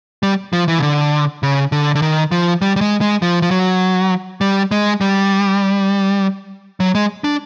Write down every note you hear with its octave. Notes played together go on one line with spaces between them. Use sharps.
G3
F3
E3
C#3
D3
C#3
D3
D3
D#3
F3
G3
G3
G#3
G#3
F3
F3
F#3
G3
G#3
G3
F#3
G#3
D4